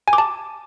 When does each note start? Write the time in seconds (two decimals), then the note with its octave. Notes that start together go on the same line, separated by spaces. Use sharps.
0.08 G#5
0.13 D6
0.18 A5